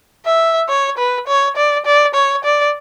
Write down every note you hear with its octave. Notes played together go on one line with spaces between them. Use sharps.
E5
C#5
B4
C#5
D5
D5
C#5
D5